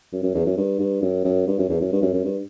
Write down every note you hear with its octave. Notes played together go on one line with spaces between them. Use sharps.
F#2
F#2
E2
F#2
G2
G2
F#2
F#2
G2
F#2
E2
F#2
G2
F#2
F#2
G2